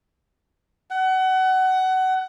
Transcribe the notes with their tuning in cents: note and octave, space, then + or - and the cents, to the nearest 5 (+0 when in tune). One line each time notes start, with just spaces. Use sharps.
F#5 +25